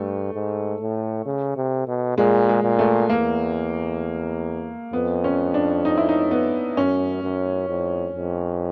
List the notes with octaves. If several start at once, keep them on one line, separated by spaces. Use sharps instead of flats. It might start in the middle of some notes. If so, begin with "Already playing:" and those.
Already playing: G2 A3
G#2
A2
C#3
C3
B2
A#2 G#3
G#3
A#2
A3
E2 A#3
F2 B3
C#4
D4
D#4
E4
D#4
B3
F#2 C#4
F#2
F2
F2